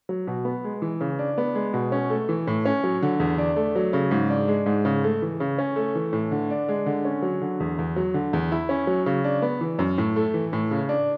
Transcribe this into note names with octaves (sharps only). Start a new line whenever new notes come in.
F#3
B2
B3
G#3
E3
C#3
D4
B3
G#3
B2
C#4
A3
E3
A2
C#4
F#3
D3
E2
D4
A3
F#3
C#3
G#2
D4
G#3
G#2
C#3
A3
E3
C#3
C#4
A3
E3
A2
D3
D4
G#3
D3
C#4
F#3
D3
E2
E2
F#3
D3
E2
E4
C#4
F#3
C#3
D4
B3
E3
F#2
A2
A3
E3
A2
C#3
D4